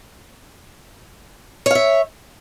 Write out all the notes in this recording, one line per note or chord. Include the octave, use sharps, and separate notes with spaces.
C#5 E5 F5